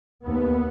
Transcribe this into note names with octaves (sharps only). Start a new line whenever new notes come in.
D#2 B3